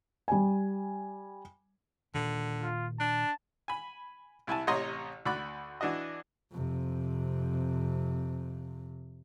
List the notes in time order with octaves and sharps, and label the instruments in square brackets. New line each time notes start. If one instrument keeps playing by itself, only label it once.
[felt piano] G3 G#5
[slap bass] A#2 D#3 [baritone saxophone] D3
[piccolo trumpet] F4
[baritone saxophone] D4 [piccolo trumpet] A5
[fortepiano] G#5 B5
C2 E4 G#5 A5
A1 C3 C#5 D#5 A#5 C6
D2 F#4 D5 B5 D6 F#6
E3 D4 F#4 D#5
[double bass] F2 C3